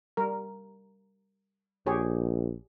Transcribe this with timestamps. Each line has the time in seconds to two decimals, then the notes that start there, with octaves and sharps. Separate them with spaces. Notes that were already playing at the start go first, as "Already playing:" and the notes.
0.17 G3 A#4
1.86 A#1 G4 G#4 C#5